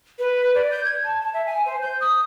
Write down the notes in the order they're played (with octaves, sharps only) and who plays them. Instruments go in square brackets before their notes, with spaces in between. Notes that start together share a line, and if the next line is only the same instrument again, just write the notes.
[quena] B4
D5
G6
G#6
A5
A5
E5
G#5
C5
G6
D#6